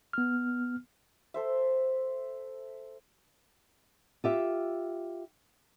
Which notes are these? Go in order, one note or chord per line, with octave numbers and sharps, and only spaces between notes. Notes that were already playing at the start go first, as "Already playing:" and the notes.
B3 F6
A4 C5 E5
F4 G4 E5